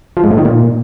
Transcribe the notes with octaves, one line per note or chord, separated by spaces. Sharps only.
F3
G#2
A2
D#3
A#2